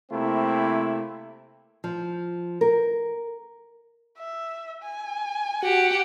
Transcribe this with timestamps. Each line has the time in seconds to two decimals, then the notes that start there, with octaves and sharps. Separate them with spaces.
0.11 C3 A3 A#3 C4 E4
1.84 F3
2.61 A#4
4.18 E5
4.82 G#5
5.63 F#4 G4 F#5